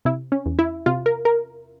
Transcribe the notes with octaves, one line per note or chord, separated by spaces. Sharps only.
C3 E4
C#4
E2
E4
C3 F4
A#4
A#4